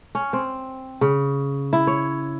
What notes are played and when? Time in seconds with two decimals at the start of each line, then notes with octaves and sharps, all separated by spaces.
0.15 C#4
0.33 C4
1.01 C#3
1.73 E4
1.87 C#5